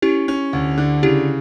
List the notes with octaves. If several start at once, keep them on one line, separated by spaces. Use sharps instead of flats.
C#4 E4 G4
C#4
D2
D3
C#3 E4 G4